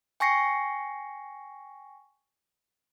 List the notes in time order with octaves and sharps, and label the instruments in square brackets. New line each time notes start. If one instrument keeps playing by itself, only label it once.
[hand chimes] G5 G#5 C#6 A#6 C7 C#7